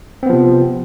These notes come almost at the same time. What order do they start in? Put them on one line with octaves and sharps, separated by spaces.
C4 B3 F3 C3